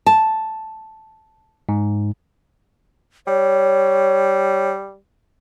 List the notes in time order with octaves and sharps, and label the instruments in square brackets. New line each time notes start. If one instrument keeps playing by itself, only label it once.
[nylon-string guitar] A5
[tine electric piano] G#2
[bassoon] G3 [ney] C#5